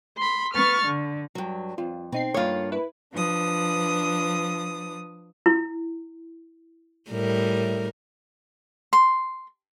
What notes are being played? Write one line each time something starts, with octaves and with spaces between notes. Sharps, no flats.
B5 C6
B3 C#6 F6 A6
D3
G2 F#3
F2 F4
B2 C4 D#4 C7
G2 A#3 F4 C#5
E4 B4
F3 D4 B4 D#6
E4
A2 G3 A#4
C6